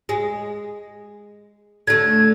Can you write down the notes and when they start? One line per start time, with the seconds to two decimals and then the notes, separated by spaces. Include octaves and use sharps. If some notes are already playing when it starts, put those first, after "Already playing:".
0.09 G#3
1.87 D3 A3 G#6